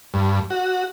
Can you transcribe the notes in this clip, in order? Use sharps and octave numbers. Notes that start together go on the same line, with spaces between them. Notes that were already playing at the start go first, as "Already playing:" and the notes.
G2
F#4